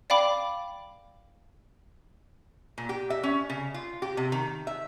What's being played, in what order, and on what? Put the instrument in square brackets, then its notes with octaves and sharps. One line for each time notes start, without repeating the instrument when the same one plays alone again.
[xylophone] D5 F5 G5 B5 D6
[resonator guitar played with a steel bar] A#2
G4
E5
C#4
C#3
F4
G4
C3
D#3
E5